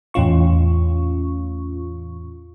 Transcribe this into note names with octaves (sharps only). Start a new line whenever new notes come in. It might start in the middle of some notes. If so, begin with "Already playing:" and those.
E2 A2 C#4 F4 C#6